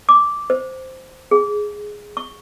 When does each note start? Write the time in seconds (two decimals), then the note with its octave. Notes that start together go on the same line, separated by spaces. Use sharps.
0.09 D6
0.50 C5
1.31 G#4
2.17 C#6